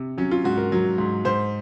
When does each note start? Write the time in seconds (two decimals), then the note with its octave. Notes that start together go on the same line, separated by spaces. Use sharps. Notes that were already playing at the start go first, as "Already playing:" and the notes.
Already playing: C3
0.18 F#3 C#4
0.31 F4
0.44 G#2 F#4
0.58 A#4
0.72 F#3
0.98 G#2
1.25 G#2 C5